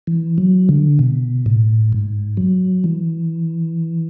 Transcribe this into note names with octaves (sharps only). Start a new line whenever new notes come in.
E3
F#3
D3
B2
A2
G#2
F#3
E3